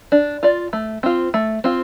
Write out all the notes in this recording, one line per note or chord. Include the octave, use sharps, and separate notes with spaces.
D4
F4 D5
A3
C4 F4
A3
C4 F4